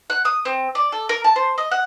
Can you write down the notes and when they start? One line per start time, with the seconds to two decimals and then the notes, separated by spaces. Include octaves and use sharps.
0.10 F#5
0.25 D#6
0.45 C4
0.75 D5
0.92 A4
1.09 A#4
1.24 A5
1.36 C5
1.58 D#5
1.71 F#5